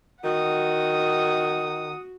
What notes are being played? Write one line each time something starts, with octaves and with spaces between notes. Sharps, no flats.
D#3 F#4 F#5 D#6